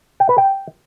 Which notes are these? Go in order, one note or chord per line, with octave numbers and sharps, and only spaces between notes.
G5
B4
G5